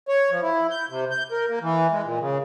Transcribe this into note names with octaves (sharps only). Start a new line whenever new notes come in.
C#5
F3
E4
G6
C3
G6
A#4
A#3
E3
G#3
A#2
C#3